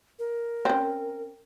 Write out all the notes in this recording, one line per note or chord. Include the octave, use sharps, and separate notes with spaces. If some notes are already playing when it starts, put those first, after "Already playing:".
A#4
C4 C#4